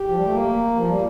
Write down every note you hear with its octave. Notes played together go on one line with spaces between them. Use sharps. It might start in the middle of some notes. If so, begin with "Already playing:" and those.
Already playing: G4
F3
G3
A3
A#3
F3
G3